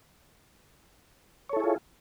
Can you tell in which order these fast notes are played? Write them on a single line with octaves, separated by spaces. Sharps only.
C#5 A4 E4 G#4 F4